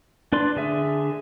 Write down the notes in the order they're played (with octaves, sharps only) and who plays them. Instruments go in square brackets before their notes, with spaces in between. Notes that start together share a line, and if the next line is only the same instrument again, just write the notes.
[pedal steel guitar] D4 B4 D5 C6
D3 G#4 E5